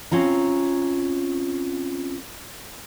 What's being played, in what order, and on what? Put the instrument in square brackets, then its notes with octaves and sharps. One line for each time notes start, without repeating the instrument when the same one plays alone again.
[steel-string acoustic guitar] C4 C#4 F4 A#5